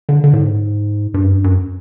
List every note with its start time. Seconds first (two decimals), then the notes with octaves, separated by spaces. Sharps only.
0.09 D3
0.24 D3
0.33 A2
0.39 G#2
1.14 G2
1.24 F#2
1.29 G2
1.44 F#2